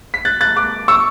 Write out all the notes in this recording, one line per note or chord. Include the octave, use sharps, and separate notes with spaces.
B6
F#6 A6
F#6 A6
D6 F#6
C#6 E6